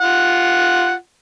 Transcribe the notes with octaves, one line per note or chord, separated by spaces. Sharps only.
F4 F#5